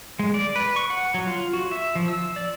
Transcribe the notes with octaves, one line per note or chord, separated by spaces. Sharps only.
G#3
D5
B4
C#6
F#5
F#3
F4
F#4
E5
F3
E6
D5